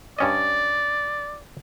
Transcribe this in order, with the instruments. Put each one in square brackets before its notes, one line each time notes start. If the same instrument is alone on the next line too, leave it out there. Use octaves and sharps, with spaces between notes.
[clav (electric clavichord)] G2 C#4 D#5 [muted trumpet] D5